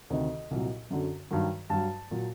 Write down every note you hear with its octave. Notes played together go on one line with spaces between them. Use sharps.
D2 C3 D#3 D#5
C2 A#2 F#3
F#2 D3 F#3
G2 D#3 F#3
G2 F#3 A5
A#2 F#3